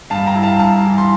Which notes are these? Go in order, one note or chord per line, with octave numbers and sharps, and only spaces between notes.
G2 F5 A5
G5 A#5
E4
F5 A5
G2 F5 A5
E3
C6